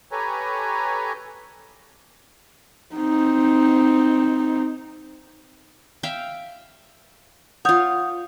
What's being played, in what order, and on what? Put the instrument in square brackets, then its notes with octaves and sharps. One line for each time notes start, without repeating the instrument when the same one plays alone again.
[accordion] G4 A4 B4 C#5 G#5 A#5
[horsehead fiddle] C4 D#4
[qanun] E5 F5 G5
[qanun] F4 C#5 [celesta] F#5 D#6 G6